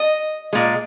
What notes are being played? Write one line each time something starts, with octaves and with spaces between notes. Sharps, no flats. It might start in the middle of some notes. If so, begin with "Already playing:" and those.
Already playing: D#5
A#2 G#3